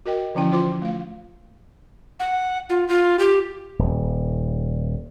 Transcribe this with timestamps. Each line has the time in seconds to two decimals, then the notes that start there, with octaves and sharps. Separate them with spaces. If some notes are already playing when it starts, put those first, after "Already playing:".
0.06 F#4 A#4 D#5 G5
0.35 D3 E3 F3 C#4 E4 G5
0.52 F4 C5 C6 D6
0.82 A3 F5
2.20 F#5
2.70 F4
2.89 F4
3.19 G4
3.79 D#1